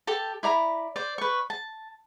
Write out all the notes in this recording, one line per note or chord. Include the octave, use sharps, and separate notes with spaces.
G4 A4 A5
E4 D5 A#5 B5
C5 D5
B4 C#6
A5